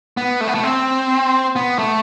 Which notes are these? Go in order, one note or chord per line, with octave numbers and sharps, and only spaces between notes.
B3
A3
B3
A3
C4
B3
A3